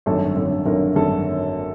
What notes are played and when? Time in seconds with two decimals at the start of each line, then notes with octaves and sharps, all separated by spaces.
0.06 G#1 F#2 D3 A4
0.35 G#1 F#2 D3
0.66 G#1 F#2 D3 A#4
0.95 G#1 F#2 D3 A4